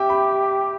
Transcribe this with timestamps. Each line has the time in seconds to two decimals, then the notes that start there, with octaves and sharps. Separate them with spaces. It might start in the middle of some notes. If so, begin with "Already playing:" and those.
Already playing: G4 E5 G5
0.10 B5